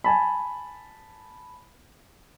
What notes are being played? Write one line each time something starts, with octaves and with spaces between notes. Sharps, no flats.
G#5 A5 B5